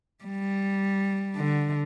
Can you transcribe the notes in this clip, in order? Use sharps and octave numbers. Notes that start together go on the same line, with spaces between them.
G3
D3